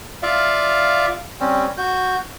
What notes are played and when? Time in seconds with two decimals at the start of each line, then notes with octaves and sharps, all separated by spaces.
0.23 F4 D5 E5 F5
1.40 G3 C4 C#4
1.78 F#4 G6